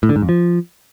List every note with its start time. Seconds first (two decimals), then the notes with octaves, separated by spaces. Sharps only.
0.03 A2
0.09 D3
0.16 G#2
0.22 F2
0.29 F3